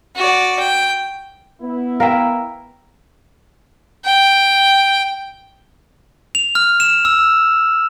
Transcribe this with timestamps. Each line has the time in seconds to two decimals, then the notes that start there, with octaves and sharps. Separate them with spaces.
0.16 F#4 D5
0.59 G5
1.62 B3 E4
2.00 A#4 E5 F5 G5
4.06 G5
6.35 F7
6.55 F6
6.80 E7
7.05 E6